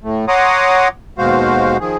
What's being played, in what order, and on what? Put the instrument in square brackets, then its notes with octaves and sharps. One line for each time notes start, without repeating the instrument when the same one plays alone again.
[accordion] A2 A3
C#5 F#5 A#5 C6 D6 D#6
D#2 B2 G#3 F#4 C5 F5
D#3 F3 G#4